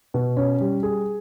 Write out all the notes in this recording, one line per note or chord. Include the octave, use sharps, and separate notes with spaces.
B2
C#4
G3
G#4